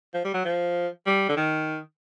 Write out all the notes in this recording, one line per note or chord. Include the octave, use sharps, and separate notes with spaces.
F3
G3
F#3
F3
G3
D3
D#3